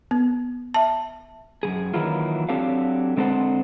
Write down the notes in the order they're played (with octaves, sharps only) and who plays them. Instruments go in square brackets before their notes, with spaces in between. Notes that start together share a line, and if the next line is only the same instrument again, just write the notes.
[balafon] B3
E5 A5
[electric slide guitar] F#2 F3 G#4
D#3 E3 F#3 A#3 E4 F4
F#3 C4 D4 G4 A4 F5
D3 G#3 C4 A4 C5 F#5